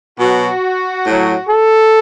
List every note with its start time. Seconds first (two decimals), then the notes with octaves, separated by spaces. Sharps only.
0.19 B2 F#3 F#4
1.05 A2 F#3
1.47 A4